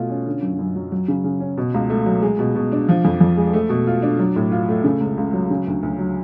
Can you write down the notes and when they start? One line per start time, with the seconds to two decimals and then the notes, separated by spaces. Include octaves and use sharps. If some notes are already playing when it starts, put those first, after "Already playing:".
Already playing: B2 A3 F4
0.10 C#4
0.26 D3
0.42 F#2
0.59 F#2
0.76 F#3
0.92 F#3
1.08 C#3
1.24 C#3
1.40 C#4
1.58 B2
1.74 C#2
1.90 A3
2.06 F#3
2.23 G#3
2.39 B2
2.55 B2
2.72 D4
2.89 F3
3.05 F2
3.20 F2
3.37 G#3
3.53 A3
3.69 B2
3.87 F4
4.02 D4
4.19 F#3
4.36 A2
4.51 F4
4.69 A3
4.84 C#3
5.00 C#2
5.17 C#2
5.33 F#3
5.50 C#3
5.67 D2
5.83 D2
5.99 F#3